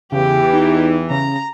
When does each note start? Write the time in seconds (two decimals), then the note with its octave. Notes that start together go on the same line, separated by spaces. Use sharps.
0.12 E2 C#3 E3 G4
0.53 D#4
1.10 C#3 A#5